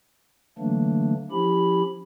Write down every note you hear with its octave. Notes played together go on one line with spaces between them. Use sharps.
D3 E3 F#3 A3 A#3 D4
F3 C#4 E4 G4 B5